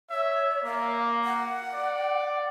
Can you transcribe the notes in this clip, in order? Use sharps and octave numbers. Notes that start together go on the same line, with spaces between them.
C#5 E5
A#3 F5
F#5
D5